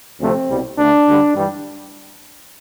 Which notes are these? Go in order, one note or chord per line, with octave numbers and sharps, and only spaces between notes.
D2 C3 F3 A3 C4
C2 B2 G3
D2 D3 A3 D4
D2 D3 G3
G2 E3 G3